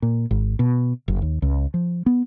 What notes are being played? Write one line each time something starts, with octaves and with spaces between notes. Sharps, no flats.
A#2
G#1
B2
F#1
D#2
C#2
F3
B3